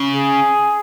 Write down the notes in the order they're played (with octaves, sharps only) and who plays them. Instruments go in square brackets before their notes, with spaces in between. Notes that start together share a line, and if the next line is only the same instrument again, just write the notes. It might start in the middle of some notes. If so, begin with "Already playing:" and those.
Already playing: [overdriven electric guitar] C#3
[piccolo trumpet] G#4